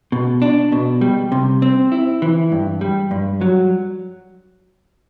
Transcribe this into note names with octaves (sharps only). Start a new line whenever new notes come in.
B2
D4
B2
G3
C3
C4
E4
E3
G2
G3
G2
F#3